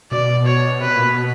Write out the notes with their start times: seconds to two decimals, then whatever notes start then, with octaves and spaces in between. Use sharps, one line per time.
0.12 B2 D5
0.46 C#5
0.80 C3 B4
0.88 B2
0.96 A#2
1.04 B2